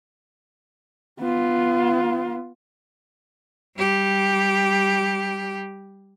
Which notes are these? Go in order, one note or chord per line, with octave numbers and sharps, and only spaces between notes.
B3 F4
G3 G4